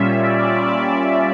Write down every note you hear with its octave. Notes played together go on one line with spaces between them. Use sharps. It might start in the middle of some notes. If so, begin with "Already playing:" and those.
Already playing: A#2 G3 C#4 F4 E5
D5